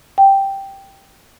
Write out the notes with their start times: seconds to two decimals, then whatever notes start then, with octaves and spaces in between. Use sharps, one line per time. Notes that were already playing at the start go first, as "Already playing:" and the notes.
0.18 G5